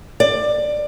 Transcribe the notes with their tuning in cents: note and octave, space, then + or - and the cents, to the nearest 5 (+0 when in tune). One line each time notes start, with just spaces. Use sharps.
D5 +15